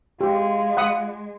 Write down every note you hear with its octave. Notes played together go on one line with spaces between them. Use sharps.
G#3 F4 G4
F#5 B5 D#6